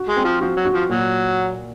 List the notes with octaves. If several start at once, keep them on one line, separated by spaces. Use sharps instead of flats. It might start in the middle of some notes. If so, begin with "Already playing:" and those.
Already playing: F#4
G#3
C4
F3
F3 F#4
F#3
F#4
F3
A#2 F#3